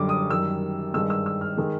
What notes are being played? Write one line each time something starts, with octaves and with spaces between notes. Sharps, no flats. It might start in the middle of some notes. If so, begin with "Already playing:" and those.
Already playing: F#2 D3 G3 D6
D#6
F#2 D#3 G3 E6
G2 D#3 G#3 E6
E6
E6
F6
D#3 G#3